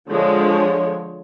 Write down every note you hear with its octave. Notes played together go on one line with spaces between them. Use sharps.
D3 F3 G#3 C#5